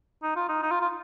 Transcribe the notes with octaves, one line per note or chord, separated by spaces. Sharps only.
D#4
F4
D#4
D#4
F4
F4